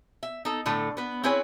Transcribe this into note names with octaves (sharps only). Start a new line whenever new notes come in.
E5
D#4 A4
A2 D3 A3 A4
B3 B4
C4 C#4 E4 G#4 B4 C#5